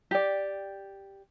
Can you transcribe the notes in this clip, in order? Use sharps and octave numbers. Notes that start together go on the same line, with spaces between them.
G4 D5